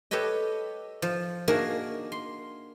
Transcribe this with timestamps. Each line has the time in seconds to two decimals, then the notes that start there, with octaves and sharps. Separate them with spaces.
0.11 G4 A4 B4 C#5 D#5
1.02 F3
1.48 A#3 D4 D#4 F#4 G#4 A#4
2.12 C6